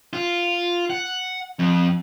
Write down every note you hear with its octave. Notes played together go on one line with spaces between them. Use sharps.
F4
F#5
F2